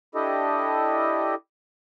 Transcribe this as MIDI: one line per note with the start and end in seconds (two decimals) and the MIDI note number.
0.15 1.35 62
0.15 1.35 64
0.15 1.35 67
0.15 1.35 69
0.15 1.35 75